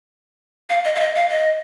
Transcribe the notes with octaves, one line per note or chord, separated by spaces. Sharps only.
F5
D#5
F5
D#5
F5
D#5